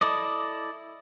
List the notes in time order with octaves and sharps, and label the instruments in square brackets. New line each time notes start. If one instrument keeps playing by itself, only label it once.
[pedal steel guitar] E4 A4 D5 D#5